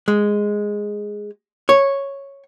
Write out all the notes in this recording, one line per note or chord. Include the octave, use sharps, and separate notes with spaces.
G#3
C#5